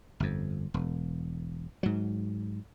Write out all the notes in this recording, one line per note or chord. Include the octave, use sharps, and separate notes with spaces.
G1 F2
E1
G#2 F#3